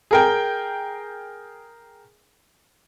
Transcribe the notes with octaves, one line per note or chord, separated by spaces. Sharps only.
G#4 A#4 G5